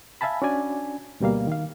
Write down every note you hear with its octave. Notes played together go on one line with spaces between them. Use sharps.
E5 F5 G#5 A5 B5
C#4 D4 F#4 D5 G#5
D2 B2 G3 A#3 F5
D#3 F5